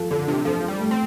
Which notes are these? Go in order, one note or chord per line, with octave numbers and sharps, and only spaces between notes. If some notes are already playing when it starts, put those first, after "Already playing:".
Already playing: F3 A4
D3 A4
C3 D4
F3 A4
A4
G3
A3
C4